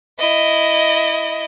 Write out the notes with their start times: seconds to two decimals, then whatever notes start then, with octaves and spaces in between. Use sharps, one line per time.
0.19 E4 D#5